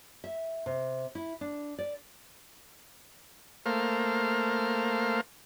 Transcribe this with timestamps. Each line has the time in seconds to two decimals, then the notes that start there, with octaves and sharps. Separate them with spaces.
0.24 E5
0.66 C3
1.15 E4
1.41 D4
1.79 D5
3.66 A3 A#3 C5 F5